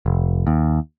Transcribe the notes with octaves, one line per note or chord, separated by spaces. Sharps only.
F1
D#2